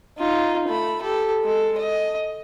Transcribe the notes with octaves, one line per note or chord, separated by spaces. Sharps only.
D#4 F4
A3 B5
G4 A4
G#3 A4
D#5